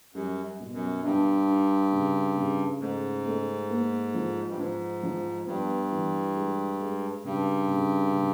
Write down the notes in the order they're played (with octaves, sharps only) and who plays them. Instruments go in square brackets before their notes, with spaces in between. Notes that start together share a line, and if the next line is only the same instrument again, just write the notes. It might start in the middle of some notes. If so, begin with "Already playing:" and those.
[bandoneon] F#2 [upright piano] G3
[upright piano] B2
[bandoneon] F#2
[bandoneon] G2 [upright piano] D4
[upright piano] D4
C#3
C#3
[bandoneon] G#2 [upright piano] A3
[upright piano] A3
A#3
F3
[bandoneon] G2
[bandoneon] G#2 [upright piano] F3
[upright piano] F3
[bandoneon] G2 [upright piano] B3
[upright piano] E3
G#3
G#3
[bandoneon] G2 [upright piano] C#3
[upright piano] C#3
C#3